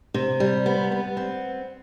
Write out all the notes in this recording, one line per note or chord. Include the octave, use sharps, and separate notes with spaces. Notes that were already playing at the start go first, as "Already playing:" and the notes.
C3
G3
B3
B3
C4